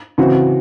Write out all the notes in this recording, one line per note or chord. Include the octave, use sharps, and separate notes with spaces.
C#3 E3 C4 F#4